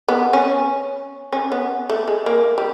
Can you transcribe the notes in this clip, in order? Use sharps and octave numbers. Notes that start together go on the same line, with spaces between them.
B3
C#4
C#4
B3
A3
G#3
A#3
G3